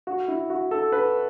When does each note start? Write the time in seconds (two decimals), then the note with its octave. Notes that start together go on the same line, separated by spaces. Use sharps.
0.07 F#4
0.28 E4
0.50 F#4
0.71 A4
0.92 B4